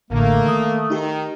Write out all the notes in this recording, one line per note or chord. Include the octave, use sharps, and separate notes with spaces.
A1 A2 D3 A3 A#3
D#3 D#6
D#3 D#4 G4